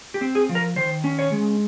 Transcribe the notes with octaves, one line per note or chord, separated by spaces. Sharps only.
G4
C4
G#4
F3
A#4
D#3 C5
C#4
C#5
G#3